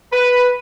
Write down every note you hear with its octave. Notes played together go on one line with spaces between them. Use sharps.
B4